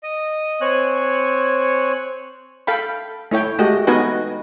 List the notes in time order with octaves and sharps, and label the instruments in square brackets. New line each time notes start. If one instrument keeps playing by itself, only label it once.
[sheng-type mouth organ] D#5
C4 C#5 G#5 F#6
[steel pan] A4 F5 G5 B5
A3 E4 C#5 G5
G#3 A3 F#4 G4 D#5
B3 D#4 F#4 B4 D#5 G#5